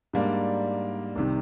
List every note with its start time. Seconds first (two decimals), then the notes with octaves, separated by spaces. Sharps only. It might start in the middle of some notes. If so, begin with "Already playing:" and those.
0.13 G#2 G3 A#3 D4
1.16 C2 C3 D#3